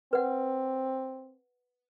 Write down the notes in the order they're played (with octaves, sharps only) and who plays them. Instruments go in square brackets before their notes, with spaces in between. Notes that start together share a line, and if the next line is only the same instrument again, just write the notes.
[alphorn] C4 [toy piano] B4 F#5